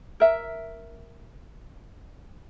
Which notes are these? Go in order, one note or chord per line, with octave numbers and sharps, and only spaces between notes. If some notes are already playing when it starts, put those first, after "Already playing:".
A#4 E5